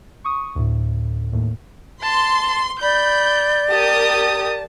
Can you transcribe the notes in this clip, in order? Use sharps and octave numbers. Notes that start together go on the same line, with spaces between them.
C#6 D#6
D2 A2
D#2 A2
A5 C6
D5 B5 G6
G4 A#4 A5 D#6